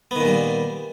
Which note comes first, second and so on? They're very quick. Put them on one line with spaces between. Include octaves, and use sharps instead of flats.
B3 D#3 A#2 G3